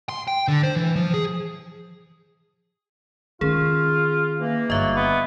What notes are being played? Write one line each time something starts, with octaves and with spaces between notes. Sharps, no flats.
C6
G5
D3
C5
E3
F3
G#4
D#3 C#4 F4 G#4
E3 A#3
G1 F#3 D#5 E5
B3